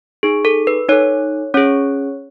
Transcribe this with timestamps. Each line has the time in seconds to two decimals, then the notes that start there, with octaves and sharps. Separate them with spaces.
0.23 D#4 G#4
0.45 A4
0.67 B4
0.88 D#4 A4 C#5
1.54 C#4 G#4 C#5